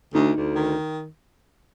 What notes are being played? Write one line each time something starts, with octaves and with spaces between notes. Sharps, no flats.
D2 D#4
D2
D#3